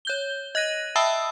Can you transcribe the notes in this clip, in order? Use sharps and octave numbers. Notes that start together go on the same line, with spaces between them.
C#5 G6 G7
D#5 F#6 A#6 D#7
E5 G5 A5 B5 D#6 E6